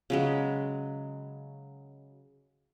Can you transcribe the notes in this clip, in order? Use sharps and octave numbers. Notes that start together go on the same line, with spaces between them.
C#3 F#3 G#3